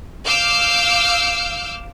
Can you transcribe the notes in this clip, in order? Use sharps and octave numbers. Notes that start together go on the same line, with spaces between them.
F5 D6 E6 F6 G6